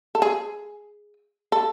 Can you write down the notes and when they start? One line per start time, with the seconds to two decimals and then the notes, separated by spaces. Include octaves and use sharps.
0.15 A4
0.22 G#4
1.52 A4